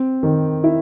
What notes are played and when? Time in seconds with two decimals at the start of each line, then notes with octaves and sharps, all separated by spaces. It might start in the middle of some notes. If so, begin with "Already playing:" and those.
Already playing: C4
0.23 D#3
0.64 E4